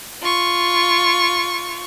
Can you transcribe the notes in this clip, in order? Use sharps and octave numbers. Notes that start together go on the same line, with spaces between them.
F4 C#6